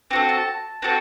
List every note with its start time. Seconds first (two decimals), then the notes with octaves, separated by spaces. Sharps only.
0.11 C4 F#4 A4
0.29 A5
0.82 C4 F#4 A4